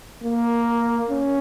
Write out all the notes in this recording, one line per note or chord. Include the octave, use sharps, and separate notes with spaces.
A#3
C#4